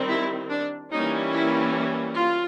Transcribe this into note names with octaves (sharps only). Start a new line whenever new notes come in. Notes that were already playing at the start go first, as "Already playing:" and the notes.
Already playing: D#3 G3 C4
E4
D4
E3 G3 A#3 C#4 D#4
E4
F4